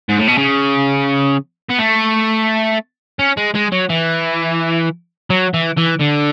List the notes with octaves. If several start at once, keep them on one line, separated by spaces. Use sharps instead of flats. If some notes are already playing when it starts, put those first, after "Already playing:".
G#2
A2
B2
C#3
B3
A3
C#4
G#3
G#3
F#3
E3
F#3
E3
E3
D3